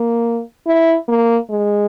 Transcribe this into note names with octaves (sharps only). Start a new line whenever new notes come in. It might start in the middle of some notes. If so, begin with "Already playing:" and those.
Already playing: A#3
E4
A#3
G#3